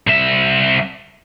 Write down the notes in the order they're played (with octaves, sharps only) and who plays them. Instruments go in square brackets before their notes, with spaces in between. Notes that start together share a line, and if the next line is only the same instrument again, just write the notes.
[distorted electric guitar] C2 E5